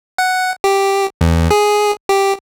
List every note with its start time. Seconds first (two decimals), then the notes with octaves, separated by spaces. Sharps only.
0.18 F#5
0.64 G4
1.21 E2
1.51 G#4
2.09 G4